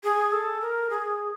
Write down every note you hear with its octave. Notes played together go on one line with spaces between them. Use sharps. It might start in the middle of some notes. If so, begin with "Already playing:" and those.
G#4
A4
A#4
G#4